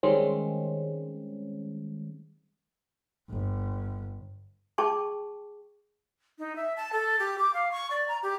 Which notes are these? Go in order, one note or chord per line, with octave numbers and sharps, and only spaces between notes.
D#3 G3 G#3 C4 C#4
G1
G#4 G5 A5 C#6 D6
D#4
E5
A5
A4
G4
D6
F5
C#6
D5
A#5
G4